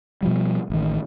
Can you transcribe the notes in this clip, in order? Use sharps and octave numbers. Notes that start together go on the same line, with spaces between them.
B2 F3 G3
A1 D#3